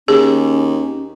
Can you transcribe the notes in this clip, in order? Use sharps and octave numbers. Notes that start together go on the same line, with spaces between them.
D#2 C#4 G#4